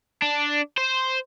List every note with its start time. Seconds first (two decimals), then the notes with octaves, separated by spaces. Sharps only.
0.22 D4
0.78 C5